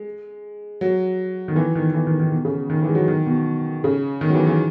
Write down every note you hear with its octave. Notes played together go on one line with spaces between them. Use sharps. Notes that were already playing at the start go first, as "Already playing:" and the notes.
Already playing: G#3
F#3
D#3
E3
D#3
D#3
E3
D#3
D#3
B2
C#3
D#3
E3
G#3
F#3
D#3
B2
C#3
D#3
F#3
E3
E3